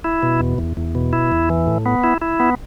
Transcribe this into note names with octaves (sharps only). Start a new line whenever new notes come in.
E4
B2
E2
E2
E2
B2
E4
E2
E3
A2
B3
E4
E4
B3